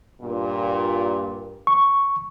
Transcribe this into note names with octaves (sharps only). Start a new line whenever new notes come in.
G2 A#2
C#6